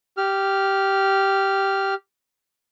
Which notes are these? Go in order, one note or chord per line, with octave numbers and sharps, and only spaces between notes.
G4 F6